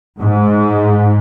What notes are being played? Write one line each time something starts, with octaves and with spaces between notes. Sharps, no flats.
G#2